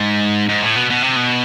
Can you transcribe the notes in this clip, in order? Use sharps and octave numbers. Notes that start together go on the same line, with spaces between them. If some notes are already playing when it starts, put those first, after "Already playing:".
Already playing: G#2
G#2
A2
B2
B2
C3
B2